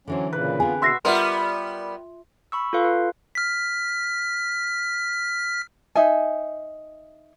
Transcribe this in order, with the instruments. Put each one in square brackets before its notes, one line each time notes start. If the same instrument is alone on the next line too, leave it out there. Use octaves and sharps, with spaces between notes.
[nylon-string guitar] D3 E3 C5 [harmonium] F#3 C#4
[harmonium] A#2 C#3 [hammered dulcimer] B4
[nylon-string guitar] D3 C4 G#4 [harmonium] B3 F4 [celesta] G#5
[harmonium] B2 [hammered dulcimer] F#4 E5 [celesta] C6 A#6 C7
[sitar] G3 B3 A#4 [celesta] F4 E5 C6
[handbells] B5 C#6 E6
F4 A4 B4 F5
B4
[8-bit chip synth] F6 B6
[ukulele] D#4 E5 G#5